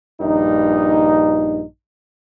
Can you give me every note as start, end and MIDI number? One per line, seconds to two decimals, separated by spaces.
0.21 1.63 34
0.21 1.63 43
0.21 1.63 63